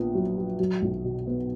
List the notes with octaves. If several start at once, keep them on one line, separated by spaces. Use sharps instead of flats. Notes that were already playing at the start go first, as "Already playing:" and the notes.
Already playing: A#1 A#2 B3
F#3
F#4
F#3
B1
B2
B3